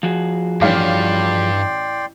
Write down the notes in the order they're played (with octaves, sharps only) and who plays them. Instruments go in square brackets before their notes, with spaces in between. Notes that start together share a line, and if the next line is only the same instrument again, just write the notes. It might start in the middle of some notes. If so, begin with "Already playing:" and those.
[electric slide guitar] F3 F#4 G#4
[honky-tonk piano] A1 F5 D6 [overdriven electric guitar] G2 [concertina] D5 G5 C6